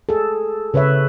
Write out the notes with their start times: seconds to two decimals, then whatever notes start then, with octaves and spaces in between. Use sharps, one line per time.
0.09 G#4 A4
0.74 C#3 B4 C#5 E5